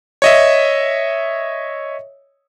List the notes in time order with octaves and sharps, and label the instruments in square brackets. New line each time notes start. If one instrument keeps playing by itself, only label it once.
[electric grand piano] C#5 D#5 E5